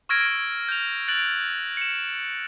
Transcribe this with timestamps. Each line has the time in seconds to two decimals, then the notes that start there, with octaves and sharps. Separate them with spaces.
0.09 C#6 E6 F6 G#6 A#6 D7
0.68 G6 F7
1.08 F#6 A6 D7 F7 F#7
1.77 C#7 E7